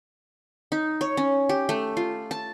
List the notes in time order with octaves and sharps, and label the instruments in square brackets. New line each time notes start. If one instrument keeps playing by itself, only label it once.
[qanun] D#4
C#5
C#4
G4
A3
F4
A5